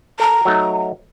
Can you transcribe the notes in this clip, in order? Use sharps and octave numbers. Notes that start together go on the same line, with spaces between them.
A4 A#5
F#3 A3 D#4